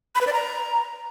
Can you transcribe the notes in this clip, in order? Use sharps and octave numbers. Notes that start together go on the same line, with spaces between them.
B5
B4
D5
A#5